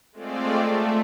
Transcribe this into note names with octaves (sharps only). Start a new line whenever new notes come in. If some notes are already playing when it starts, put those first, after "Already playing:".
G#3 A3 C4 F4 D5
A3